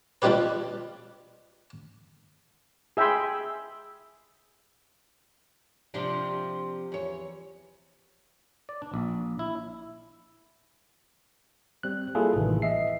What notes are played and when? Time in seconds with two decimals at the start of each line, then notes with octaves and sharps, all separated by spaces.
0.22 F3 G3 C4 D#4 G4 B4
2.97 G#4 E5 G5 G#5 B5 C6
5.94 C3 F3 D4
6.92 E2 C#5
8.69 D5
8.82 D4
8.94 A#1
9.39 E4
11.83 G3 C4 F#6
12.15 G3 A#3 E4 F4 G#4 A4
12.36 A1 A2 C3 D#3 E3
12.62 D#5 E5 C7